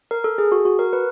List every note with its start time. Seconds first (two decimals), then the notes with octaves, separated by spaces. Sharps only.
0.11 A#4
0.24 A4
0.38 G#4
0.52 F#4
0.65 F#4
0.79 A#4
0.93 B4